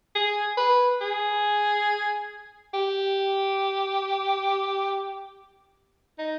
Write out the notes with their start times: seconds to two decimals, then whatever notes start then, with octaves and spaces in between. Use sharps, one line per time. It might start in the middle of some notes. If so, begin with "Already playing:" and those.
0.15 G#4
0.57 B4
1.01 G#4
2.74 G4
6.18 D#4